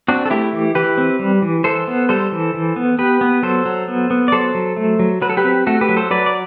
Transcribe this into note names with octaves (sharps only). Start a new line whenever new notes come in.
C4 D4 F#4
A4
A3 E4 G4
E3
E3 G4 B4
C4
G3
E3
E3 A4 C5
B3
G3 A4 C5
E3
E3
B3
B3 G4 B4
B3
F#3 A4 C5
F#3
B3
B3
D5
F#3 A4 C5
F#3
A3
F#3
F#3 B4
A4
G4 B4
C4
A3 F#4 A4
G4 B4
F#3
A4 C5
F#3 B4 D5
D5